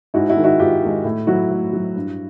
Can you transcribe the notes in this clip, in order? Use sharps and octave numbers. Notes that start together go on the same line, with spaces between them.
G#2 E4 F#4
E4 F#4
D#3 G#3
E4 F#4
G#2 F4 G4
D#3 G#3
A2
F#3 E4 F#4
A2
F#3
G2